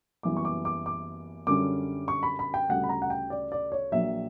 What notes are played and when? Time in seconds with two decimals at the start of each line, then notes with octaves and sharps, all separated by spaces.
0.23 F#1 F#2 E3 G3 B3 D6
0.37 C#6
0.45 D6
0.65 D6
0.86 D6
1.47 F#2 D3 G3 C#4 D6
2.08 C#6
2.23 B5
2.39 B5
2.54 G5
2.69 D2 C#3 G3 F#5
2.83 B5
2.89 A#5
3.02 F#5
3.10 G5
3.30 D5
3.52 D5
3.72 C#5
3.92 A#1 A#2 F#3 E5